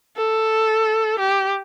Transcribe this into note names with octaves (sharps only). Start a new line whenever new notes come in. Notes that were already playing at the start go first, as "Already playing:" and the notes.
A4
G4